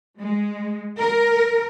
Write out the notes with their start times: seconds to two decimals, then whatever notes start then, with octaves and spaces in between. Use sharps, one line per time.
0.19 G#3
0.98 A#4